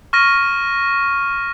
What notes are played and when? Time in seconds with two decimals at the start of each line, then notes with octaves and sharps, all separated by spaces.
0.13 C#6 F6 A#6 D#7